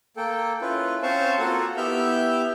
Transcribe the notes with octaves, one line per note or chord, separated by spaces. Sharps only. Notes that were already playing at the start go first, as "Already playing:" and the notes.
A#3 A4 G5
C#4 E4 F4 B4
C4 C#4 C5 F5 A5 C#6
A#3 F4 F#4 A4 F#5
B3 E4 G4 E5 F6 G6